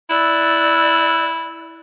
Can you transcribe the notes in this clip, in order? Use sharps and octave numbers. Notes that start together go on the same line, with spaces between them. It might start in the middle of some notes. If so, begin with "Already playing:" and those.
E4 D5 E6 F#6